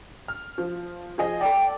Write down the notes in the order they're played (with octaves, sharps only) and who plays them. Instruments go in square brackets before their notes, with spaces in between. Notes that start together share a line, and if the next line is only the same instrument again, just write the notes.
[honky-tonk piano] F6
F3
F3 G#4 D#5
[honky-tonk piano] A4 D5 [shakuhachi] G5